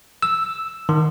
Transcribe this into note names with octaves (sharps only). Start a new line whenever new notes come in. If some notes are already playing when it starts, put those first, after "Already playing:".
E6
D#3